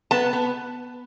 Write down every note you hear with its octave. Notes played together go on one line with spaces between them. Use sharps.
B3 A5
B3